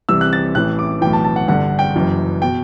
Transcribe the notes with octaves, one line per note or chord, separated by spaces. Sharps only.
C2 C3 E3 E6
F#6
A6
A1 A2 E3 F#6
D6
B1 A2 E3 G5
A5
A5
F#5
G1 G2 D3 F#5
G5
F#1 F#2 E3
B2 G5